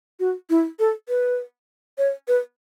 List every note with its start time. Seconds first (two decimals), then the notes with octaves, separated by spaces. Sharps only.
0.20 F#4
0.50 E4
0.79 A4
1.09 B4
1.98 C#5
2.28 B4